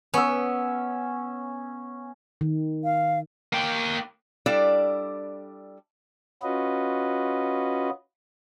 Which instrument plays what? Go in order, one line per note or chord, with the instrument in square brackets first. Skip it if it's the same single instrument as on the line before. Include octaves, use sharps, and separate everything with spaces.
[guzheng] B3 [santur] C#4 E6
[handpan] D#3
[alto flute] F5
[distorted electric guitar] A#3 G5
[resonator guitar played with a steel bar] G3 D4 E4 A4 D5 F5
[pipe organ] C#4 F4 F#4 B4 D#5